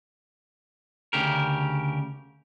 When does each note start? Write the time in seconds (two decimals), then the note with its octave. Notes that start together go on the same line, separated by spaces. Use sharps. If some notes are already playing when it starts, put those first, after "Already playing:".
1.13 D2 C#3 G4 A#4